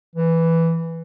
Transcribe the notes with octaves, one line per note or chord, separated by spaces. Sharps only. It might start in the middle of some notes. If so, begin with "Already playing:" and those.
E3